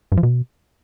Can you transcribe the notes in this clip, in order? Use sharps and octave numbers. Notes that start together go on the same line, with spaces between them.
G2
F3
B2